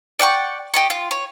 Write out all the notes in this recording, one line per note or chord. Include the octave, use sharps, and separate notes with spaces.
D5 F#5 G5 C#6
G4 D#5 C#6
F4
C#5